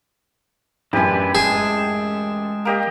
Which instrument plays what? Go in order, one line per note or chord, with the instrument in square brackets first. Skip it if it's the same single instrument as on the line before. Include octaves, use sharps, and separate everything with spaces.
[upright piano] A1 F#2 [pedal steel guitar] D4 B4 [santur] G4 G#5
[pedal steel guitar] G#3 A5 [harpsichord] G#4
[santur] A#3 G4 D#5